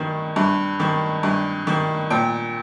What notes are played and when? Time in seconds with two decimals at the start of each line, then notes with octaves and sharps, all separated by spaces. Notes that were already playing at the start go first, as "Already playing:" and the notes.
Already playing: G2 D#3
0.36 G2
0.80 D#3
1.23 G2
1.67 D#3
2.10 A#2 G5